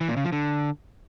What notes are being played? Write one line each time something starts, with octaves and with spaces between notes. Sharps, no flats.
E3
A#2
C#3
F3
D3